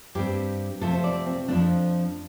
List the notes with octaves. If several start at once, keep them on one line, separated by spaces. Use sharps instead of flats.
G2 G3 C4 G4
C3 F3 A3 A4
C5
D5
C4
F2 F3 A3 D4